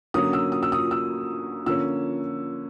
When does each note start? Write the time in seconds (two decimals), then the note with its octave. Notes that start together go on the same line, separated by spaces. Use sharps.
0.14 D3 F#3 A#3 C#4 D#6
0.33 E6
0.52 D#6
0.63 E6
0.72 D#6
0.91 E6
1.66 D3 F3 A#3 C#4 E6